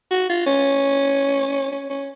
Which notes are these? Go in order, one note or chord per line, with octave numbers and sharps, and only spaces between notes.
F#4
F4
C#4
C#4
C#4